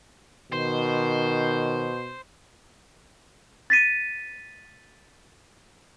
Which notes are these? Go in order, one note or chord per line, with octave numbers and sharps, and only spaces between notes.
B2 D#3 C5
A6 B6 D#7